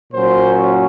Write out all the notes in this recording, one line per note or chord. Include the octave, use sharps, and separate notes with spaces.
A#2 F#3 C#4 C5